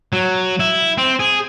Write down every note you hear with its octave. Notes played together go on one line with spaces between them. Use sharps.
F#3
E4
C4
G#4